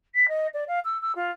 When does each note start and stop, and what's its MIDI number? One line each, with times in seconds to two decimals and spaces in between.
0.14 0.26 95
0.28 0.47 75
0.54 0.64 74
0.68 0.79 77
0.85 1.00 88
1.02 1.12 88
1.15 1.31 65